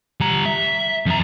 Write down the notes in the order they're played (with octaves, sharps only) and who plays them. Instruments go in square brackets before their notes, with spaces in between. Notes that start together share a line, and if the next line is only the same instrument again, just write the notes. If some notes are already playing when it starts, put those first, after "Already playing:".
[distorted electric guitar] G3 A#5
E5
F2 A#5